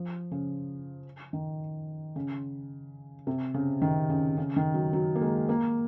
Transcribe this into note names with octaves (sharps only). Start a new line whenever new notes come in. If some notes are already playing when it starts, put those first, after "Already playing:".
Already playing: F3
C#3
D#3
C#3
C3
C#3
D#3
C#3
C#3
D#3
F#3
F#3
A#3
G#3
A#3